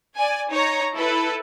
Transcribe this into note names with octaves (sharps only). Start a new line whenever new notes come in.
D5 G#5
D#4 C#5 A#5
E4 A4 B4